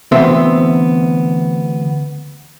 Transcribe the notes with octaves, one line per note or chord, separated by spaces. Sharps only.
D2 E3 B3 C4 C5 E5